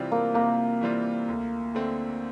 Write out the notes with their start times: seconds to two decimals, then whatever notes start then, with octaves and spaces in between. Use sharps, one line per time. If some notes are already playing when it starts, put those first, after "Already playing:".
Already playing: C3 E3 G3 C4 F4
0.12 A#3
0.34 C3 A#3
0.81 E3 G3 C4 F4
1.28 D2
1.75 D3 A3 C4